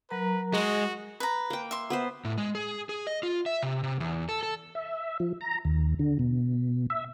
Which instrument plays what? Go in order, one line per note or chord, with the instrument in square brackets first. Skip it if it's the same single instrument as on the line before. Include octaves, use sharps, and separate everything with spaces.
[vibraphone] F#3 A#4 A#5 [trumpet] B4
[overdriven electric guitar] G#3 [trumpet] F#4 [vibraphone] D#5
[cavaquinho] B4 A#5
[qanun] A#3 G5
[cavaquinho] E5 C6
[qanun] B3 B4 C5
[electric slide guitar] A2
G#3
G#4
G#4
D#5
F4
E5
C3
C3
E2
A4
A4
[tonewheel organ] E5
F3
A#5
D#2
D3
B2
E5